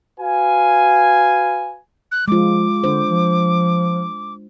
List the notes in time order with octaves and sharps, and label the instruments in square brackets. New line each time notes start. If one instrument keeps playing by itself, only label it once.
[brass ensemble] F#4 B4 F5 G#5
[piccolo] F#6
[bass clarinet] F3 [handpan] G#3 F4 [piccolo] D6
[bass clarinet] D3 [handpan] D4 C5
[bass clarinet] F3